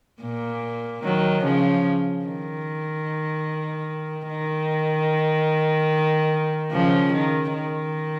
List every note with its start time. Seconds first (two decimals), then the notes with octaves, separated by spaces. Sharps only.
0.22 A#2
1.04 D#3 F#3
1.44 C#3 F3
2.25 D#3
4.28 D#3
6.72 C#3 F3
7.13 D#3
7.54 D#3